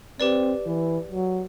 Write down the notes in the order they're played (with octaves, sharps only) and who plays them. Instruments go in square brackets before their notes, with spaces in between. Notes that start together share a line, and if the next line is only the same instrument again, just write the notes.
[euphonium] C4 [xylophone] G4 B4 D5
[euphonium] E3
F#3